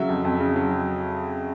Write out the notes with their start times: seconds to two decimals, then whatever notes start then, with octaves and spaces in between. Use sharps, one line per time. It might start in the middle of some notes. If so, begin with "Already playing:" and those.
Already playing: C#3 F#3 E5
0.09 F2
0.25 F2
0.40 C#3
0.56 F#3